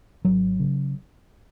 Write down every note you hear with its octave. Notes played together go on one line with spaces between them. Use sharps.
G#1 F#3
C#3